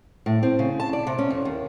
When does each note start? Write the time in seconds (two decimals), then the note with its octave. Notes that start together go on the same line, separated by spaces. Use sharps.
0.26 A2
0.43 C4
0.59 C#3
0.80 A5
0.93 D5
1.07 C3
1.18 C#4
1.30 F2
1.45 D#2